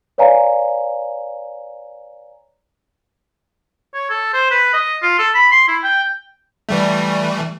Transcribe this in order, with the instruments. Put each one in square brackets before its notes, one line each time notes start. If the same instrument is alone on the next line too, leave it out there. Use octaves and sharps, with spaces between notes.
[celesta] B4 C#5 D5 F5 G#5 A#5
[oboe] C#5
A4
C5
B4
D#5
F4
A4
B5
C6
E4
G5
[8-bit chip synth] E3 G3 A3